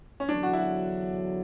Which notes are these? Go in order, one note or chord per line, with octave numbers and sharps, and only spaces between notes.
C#4
E2 D3 F#3 D4
F#4
E4
F#4